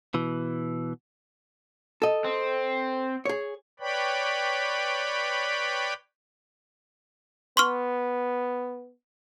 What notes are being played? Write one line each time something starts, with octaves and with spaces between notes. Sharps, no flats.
B2 E3
A4 D#5
C4
G#4 C#5
B4 C#5 D5 G5 B5
B3 C6 C#6 F6